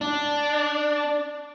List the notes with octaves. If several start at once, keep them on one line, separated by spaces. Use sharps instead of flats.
D4